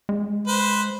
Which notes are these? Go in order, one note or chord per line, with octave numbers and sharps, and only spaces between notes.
G#3
B4 C5